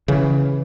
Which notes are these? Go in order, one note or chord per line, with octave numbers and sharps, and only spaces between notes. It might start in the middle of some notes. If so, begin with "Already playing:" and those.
C#3 E3